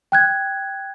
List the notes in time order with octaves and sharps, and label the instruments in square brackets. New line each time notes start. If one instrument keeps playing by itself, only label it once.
[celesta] G5 F#6 G#6